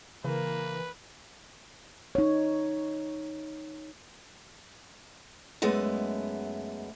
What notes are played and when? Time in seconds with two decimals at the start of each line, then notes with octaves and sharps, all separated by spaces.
0.24 C#3 E3 A#3 B4
2.15 D#4 C#5
5.62 F#2 G#3 A3 B3